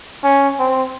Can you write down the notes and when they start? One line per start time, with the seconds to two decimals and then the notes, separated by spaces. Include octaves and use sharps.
0.23 C#4
0.59 C4